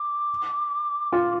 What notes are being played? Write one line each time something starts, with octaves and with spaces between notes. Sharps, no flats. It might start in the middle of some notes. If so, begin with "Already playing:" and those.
Already playing: D6
F4